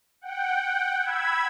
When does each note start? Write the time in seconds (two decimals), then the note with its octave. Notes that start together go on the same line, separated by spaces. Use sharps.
0.21 F#5 G5
1.00 B5 E6 G#6